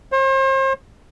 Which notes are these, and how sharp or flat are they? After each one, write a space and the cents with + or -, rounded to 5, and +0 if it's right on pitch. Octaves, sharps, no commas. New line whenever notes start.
C5 +40